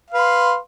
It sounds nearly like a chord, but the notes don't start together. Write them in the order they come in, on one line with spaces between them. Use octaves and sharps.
F5 B4 C6